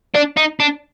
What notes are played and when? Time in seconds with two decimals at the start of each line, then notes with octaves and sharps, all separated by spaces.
0.15 D4
0.37 D#4
0.60 D4